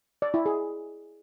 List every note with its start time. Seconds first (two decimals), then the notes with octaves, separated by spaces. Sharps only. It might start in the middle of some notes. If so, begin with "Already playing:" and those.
0.22 D5
0.34 E4
0.46 G#4